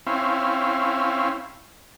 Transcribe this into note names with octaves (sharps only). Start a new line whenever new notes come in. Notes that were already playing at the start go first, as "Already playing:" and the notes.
C4 C#4 E4 F5